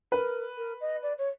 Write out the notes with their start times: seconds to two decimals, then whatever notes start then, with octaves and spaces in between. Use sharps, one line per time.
0.12 A#4 B4
0.57 A#4
0.81 D#5
1.02 D5
1.18 C#5